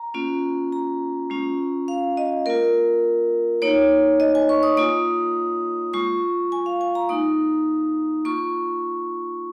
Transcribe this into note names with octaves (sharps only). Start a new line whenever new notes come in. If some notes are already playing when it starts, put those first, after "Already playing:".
Already playing: A#5
A#3 C#4 F4
A#5
G#3 C#4 F4
F5
D#5
A#3 F4 A#4
A#3 D#4 C#5
D#5
G#5
C#6
D#6
A#3 F4 D#6
G#3 F4 C#6
G#5
F5
G#5
A#5
A#3 D#4 D#6
A#3 F4 C#6